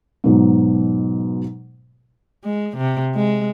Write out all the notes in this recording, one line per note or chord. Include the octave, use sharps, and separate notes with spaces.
G#2 B2 F#3
G#3
C3
G#3